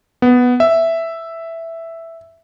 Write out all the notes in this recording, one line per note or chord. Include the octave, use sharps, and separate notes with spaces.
B3
E5